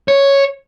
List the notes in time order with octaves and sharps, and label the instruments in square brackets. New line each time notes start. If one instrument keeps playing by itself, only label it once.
[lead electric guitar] C#5